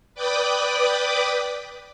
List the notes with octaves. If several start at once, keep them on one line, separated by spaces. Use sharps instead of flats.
B4 D5 G5 B5 D6 D#6